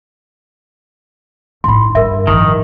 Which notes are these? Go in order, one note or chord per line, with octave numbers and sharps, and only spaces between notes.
A2 D#4 B5 C6
G2 A#4 E5
A1 D#3 F3